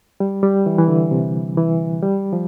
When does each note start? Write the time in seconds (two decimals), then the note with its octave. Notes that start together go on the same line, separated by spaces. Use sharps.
0.20 G3
0.43 G3
0.66 E3
0.78 E3
0.88 D3
1.11 C3
1.57 E3
2.02 G3
2.33 F3